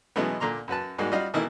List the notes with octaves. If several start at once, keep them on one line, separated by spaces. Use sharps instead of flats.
B2 E3 F#3 G#3 A3 B3
A#2 D3 A#5 C6
F#2 F#4 B4 A5
G#2 G3 G#3 A#3 F#4
G3 F4 F#4 D#5 F5
B2 D#3 E3 A3 A#3 E4